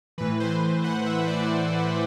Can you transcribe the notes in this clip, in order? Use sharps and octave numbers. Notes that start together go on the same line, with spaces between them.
A2 E3 B4
C5
F#5
E5
D5